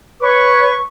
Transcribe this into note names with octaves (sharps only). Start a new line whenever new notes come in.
B4 C#5 C#6